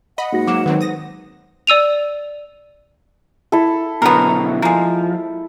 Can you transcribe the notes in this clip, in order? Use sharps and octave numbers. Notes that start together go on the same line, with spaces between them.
D#5 F#5 B5
G#2 A#3 F#4 A#6
F#3 A#3 D6 E7
D#3 F#3 C4 B4
D#6 A#6
D5 E6 D#7 F7
E4 A4
B2 D3 F#3 B3 A#4
F3 G#3 A#3